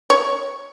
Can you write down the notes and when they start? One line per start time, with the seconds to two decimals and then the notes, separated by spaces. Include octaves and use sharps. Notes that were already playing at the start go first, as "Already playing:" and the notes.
0.10 C#5